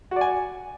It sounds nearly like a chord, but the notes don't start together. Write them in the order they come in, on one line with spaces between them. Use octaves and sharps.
F#4 D5 G#5